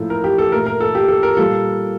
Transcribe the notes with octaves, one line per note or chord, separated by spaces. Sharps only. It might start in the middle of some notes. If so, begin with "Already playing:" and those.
Already playing: A2 F3 A#3 A4
A#4
G4
A4
A#2 A3 A#4
A#4
A4
G4
A4
A#4
A#2 G3 A#3 A4